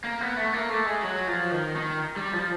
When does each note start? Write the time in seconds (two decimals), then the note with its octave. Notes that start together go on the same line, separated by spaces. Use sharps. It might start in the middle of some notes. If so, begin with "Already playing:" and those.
0.04 A#3
0.21 B3
0.37 A3
0.54 A#3
0.70 A3
0.86 G#3
1.02 F#3
1.27 F3
1.51 D#3
1.76 D#3
2.16 G3
2.33 F3